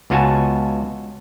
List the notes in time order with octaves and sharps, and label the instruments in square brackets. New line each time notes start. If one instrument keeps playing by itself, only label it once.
[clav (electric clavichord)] C#2 B3 F4 F#4 G#5 A5